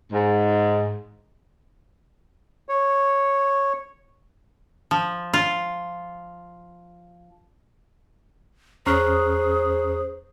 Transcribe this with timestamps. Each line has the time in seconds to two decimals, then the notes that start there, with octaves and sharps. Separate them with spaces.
0.12 G#2
2.69 C#5
4.91 F3
5.34 F4
8.86 E2 C#4 G#4 C5 A#5 C#6 F6 F#6